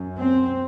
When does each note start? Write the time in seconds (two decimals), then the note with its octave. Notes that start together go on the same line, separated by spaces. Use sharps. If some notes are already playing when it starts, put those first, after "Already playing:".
Already playing: F#2
0.17 C4